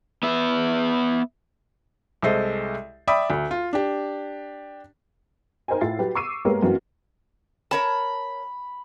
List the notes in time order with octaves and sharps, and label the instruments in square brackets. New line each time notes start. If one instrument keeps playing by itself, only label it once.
[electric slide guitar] B3 E5
[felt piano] C2 G#3 A4 C5 D#5
D5 E5 G5 B5 D6 D#6
D2
F4
D4 G4
[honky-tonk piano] D#4 A#4 C5 D#5 G5 G#5
A2 E4 F4 A6 C7
F#3 G4 B4
C#6 D6 E6 C7 D#7
G#3 A#3 B3 G4 A#4 C#5
F#2 E3 A#3 C4 F#4
[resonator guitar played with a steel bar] A#4 C#5 A5 [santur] B5